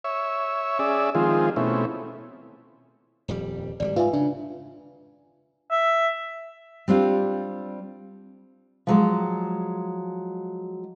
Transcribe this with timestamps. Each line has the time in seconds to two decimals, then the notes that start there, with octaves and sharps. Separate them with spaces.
0.04 C#5 E5
0.79 C#4 G#4 D5 E5
1.15 D#3 F3 G#3 C4 F4 G#4
1.56 B2 A3 C4 C#4 E4
3.28 D#1 F2 G3
3.80 G#1 C#3 G3 D5
3.96 G#2 F4 B4 E5 G#5
4.13 C#3 D4
5.71 E5
6.88 G3 C4 D4 F4
8.87 F3 F#3 G#3